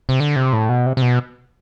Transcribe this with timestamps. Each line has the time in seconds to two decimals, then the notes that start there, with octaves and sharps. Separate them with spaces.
0.09 C3
0.20 D3
0.36 C3
0.53 A2
0.69 B2
0.86 C3
0.97 C3
1.02 B2